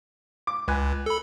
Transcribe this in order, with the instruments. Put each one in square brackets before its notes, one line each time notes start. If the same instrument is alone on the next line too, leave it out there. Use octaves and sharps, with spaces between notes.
[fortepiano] D6
[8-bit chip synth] C#2 [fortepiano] B4 G#5 F#6
[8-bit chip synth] A4 B5